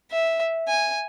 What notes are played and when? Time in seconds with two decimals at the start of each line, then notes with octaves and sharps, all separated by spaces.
0.11 E5
0.68 G#5